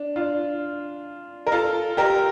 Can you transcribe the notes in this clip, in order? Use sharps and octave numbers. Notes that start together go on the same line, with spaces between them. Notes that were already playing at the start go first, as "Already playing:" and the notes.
Already playing: D4
D4 F4
A#4
F4 A4
G4 A#4